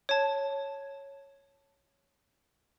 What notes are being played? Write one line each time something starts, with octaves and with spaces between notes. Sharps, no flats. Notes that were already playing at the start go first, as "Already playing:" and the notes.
C#5 A5